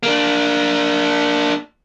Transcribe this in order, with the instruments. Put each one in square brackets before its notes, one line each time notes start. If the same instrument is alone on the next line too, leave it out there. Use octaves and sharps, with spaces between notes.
[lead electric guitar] A#3 D4